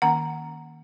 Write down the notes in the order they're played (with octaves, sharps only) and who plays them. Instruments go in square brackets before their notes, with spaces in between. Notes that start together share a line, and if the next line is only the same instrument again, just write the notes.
[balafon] D#3 A#3 C#4 F#5 A#5